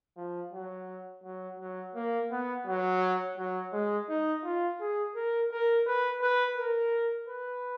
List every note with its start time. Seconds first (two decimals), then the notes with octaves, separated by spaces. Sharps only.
0.17 F3
0.53 F#3
1.24 F#3
1.59 F#3
1.95 A#3
2.31 B3
2.67 F#3
3.37 F#3
3.73 G#3
4.09 D#4
4.44 F4
4.80 G#4
5.16 A#4
5.52 A#4
5.87 B4
6.22 B4
6.58 A#4
7.28 B4